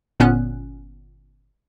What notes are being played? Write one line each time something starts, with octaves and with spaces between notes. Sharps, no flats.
G1 A#2 B3 C#4 F#6